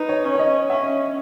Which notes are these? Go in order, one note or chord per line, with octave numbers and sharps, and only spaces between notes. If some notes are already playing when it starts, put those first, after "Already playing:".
Already playing: D#4 B4
C#5
C#4
C#5
D#5
C#4 E5